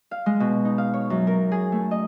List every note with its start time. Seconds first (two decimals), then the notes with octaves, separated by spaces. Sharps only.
0.11 F5
0.26 G#3
0.40 B2
0.65 D#4
0.78 F5
0.94 C#5
1.10 F#2
1.27 A#4
1.52 G#4
1.72 A3
1.91 D#5